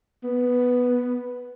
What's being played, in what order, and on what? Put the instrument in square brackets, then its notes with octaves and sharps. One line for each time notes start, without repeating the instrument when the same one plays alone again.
[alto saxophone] B3